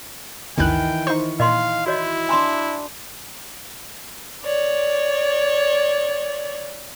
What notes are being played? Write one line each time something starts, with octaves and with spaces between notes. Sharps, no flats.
G1 D2 D#3 E3 B4 G5 F#6
D#4 C5 C#6
A#2 D#5 F5 C6
E4 F#4 C#5 D#5
D4 E5 G#5 B5 C6
C#5 D5